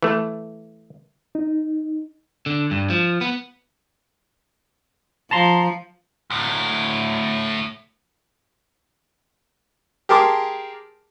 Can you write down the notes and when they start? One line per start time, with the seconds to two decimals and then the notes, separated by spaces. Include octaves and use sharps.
0.02 E3 A3
1.35 D#4
2.46 D3
2.71 G2
2.90 F3
3.21 B3
5.31 F3 A5 A#5 C6
6.30 D2 A2
10.09 G4 G#4 A#4 A5 C6 D6